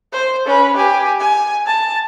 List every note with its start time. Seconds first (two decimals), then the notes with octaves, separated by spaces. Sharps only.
0.13 C5
0.46 C#4 B4
0.76 G4 G#5
1.20 G#5
1.66 A5